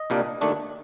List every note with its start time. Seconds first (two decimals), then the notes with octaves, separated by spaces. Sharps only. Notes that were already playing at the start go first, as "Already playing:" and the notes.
Already playing: D#5
0.10 C2 A#2 G3 A#3 D4
0.41 D#2 D#3 A3 D4